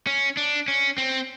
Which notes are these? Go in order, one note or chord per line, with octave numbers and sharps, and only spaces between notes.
C#4
D4
C#4
C4